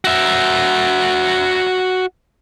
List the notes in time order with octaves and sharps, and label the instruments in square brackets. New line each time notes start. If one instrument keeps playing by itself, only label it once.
[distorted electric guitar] F#4 E5